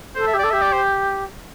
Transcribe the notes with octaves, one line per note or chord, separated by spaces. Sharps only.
A4 C5
E5
G4
D5
A4
G4 E5
D5
C5